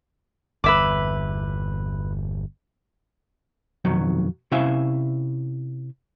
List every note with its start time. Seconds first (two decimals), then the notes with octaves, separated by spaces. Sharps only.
0.64 G1 E2 B4 E5 D6
3.85 B1 F2 D#3 F#3
4.52 C3 C#4 E4 E5 F5 G#5